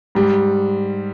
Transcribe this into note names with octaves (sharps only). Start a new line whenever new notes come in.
G#2 G3